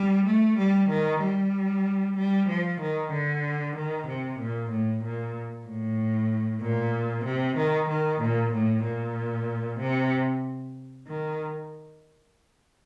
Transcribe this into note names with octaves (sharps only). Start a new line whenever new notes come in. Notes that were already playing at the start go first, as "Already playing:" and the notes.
Already playing: G3
A3
G3
D#3
G3
G3
F3
D#3
D3
D#3
C3
A#2
A2
A#2
A2
A#2
C3
D#3
D#3
A#2
A2
A#2
C3
D#3